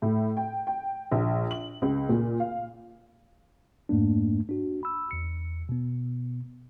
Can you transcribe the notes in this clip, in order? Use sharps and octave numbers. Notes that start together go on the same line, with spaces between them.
A2
G5
G5
A#1
F#7
C#2
A#2
F5
F2 G#2 A3 A#3 D4
D4 F#4
B5 E6
E2 C#7
B2 B3